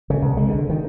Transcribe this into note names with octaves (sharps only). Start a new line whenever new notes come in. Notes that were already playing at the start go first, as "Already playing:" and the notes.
C#3
C2
G#3
D3
D#3